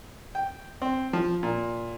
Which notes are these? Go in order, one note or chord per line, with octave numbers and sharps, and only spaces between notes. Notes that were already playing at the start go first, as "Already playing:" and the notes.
G5
C4
F3
A#2